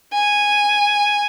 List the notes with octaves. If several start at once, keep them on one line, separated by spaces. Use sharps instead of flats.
G#5